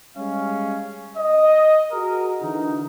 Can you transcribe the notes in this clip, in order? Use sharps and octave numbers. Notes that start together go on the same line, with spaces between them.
G3 G#3 C#4 F5
D#5
F#4 G#4 A#4
D3 E3 D#4